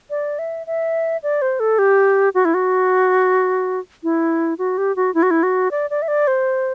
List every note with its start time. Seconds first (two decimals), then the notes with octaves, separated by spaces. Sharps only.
0.10 D5
0.39 E5
0.67 E5
1.23 D5
1.42 C5
1.60 A4
1.79 G4
2.35 F#4
2.45 E4
2.54 F#4
4.03 E4
4.59 F#4
4.78 G4
4.96 F#4
5.14 E4
5.23 F#4
5.31 E4
5.43 F#4
5.71 D5
5.90 D5
6.02 E5
6.08 D5
6.27 C5